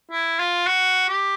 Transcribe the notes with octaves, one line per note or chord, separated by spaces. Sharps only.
E4
F4
F#4
G4